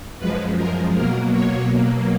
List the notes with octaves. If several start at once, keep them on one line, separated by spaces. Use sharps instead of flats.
F#2 F3 G#3 B4
A#4
B2 F#3 A#3 A#4
C#5
B2 F#3 A#3